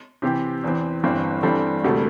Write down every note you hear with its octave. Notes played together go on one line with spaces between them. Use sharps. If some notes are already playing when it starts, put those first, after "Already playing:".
C3 E3 C4 G4
E2 E3 C4
G1 G2 E3 C4
G2 E3 G3 C4 A4
E1 D2 C3 A3